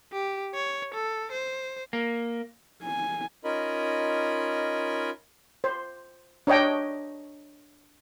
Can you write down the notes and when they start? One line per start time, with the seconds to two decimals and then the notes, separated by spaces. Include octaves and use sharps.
0.13 G4
0.55 C#5
0.94 A4
1.32 C5
1.93 A#3
2.83 G#5
3.44 C#4 D#4 F4 A#4 D#5 B5
5.64 C5
6.47 D4 C#5 D#5 G5